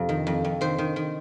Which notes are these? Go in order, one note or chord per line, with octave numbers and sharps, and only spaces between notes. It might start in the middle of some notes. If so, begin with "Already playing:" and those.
Already playing: F2 C3
D#3
F2
F2
D#3 C5
D#3
D#3